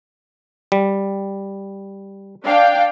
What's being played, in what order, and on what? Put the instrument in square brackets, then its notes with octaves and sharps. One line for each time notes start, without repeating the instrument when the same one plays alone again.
[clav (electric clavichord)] G3
[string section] D4 F5 G5